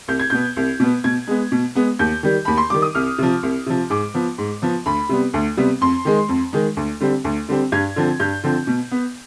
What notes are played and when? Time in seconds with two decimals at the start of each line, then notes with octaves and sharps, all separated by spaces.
0.08 C2 G6
0.20 G#6
0.30 B2 B3 G6
0.57 C2
0.80 B2 B3
1.04 B2 G#6
1.28 G#3 B3
1.52 B2
1.75 G#3 B3
1.99 D#2 G6
2.23 D#3 G3
2.45 D#2 B5
2.58 C6
2.70 D#3 G3 D6
2.82 D#6
2.95 C2 F6
3.18 C3 F3
3.43 C2
3.66 C3 F3
3.90 G#2 D6
4.14 F3 B3
4.38 G#2
4.62 F3 B3
4.86 D2 B5
5.09 C3 G3 B3
5.34 D2
5.57 C3 G3 B3
5.81 F2 C6
6.05 D#3 G#3
6.29 F2
6.53 D#3 G#3
6.77 D2
7.00 D3 G3 C4
7.24 D2
7.49 D3 G3 C4
7.72 G2 G#6
7.96 D3 F3 C4
8.20 G2 G6
8.44 D3 F3 C4
8.67 B2
8.92 B3